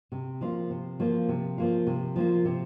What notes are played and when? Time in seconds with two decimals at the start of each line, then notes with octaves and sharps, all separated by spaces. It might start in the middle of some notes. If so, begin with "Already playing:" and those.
0.12 C3
0.41 F3 A#3 F4
0.70 C3
1.00 F3 A#3 F4
1.29 C3
1.58 F3 A#3 F4
1.87 C3
2.16 F3 A#3 F4
2.45 C3